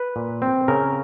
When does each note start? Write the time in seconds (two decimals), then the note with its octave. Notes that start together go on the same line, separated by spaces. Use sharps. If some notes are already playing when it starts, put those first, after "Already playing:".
Already playing: B4
0.16 A#2
0.42 C4
0.68 C#3 A#4